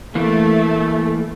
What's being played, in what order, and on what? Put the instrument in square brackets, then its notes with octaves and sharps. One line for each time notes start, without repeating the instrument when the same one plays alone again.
[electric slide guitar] E3 A#3 [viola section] A3